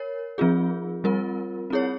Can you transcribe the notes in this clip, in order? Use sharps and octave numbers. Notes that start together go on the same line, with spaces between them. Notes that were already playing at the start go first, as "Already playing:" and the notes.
Already playing: A#4 C#5
F3 C4 F4 G#4
G3 C4 F4 A#4
C4 E4 G#4 C#5